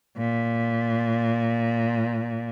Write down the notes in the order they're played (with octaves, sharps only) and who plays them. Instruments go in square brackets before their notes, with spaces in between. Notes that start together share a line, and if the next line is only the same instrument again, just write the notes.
[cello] A#2